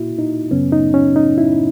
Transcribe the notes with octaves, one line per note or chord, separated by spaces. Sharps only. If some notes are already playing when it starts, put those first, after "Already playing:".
Already playing: A#2 A#3 E4 F#4
D#4
F#2 C#3 F#3 B3 C#4
D#4
C#4
D#4
E4